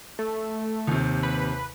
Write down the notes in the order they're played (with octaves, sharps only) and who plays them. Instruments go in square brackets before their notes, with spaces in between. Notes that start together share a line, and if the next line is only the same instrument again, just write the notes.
[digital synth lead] A3
[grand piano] D#2 C3
[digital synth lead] B4